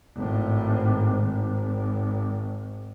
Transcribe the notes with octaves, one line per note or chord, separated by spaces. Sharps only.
G#1 A2
G#1